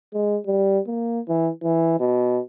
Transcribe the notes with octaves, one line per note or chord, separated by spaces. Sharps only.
G#3
G3
A#3
E3
E3
B2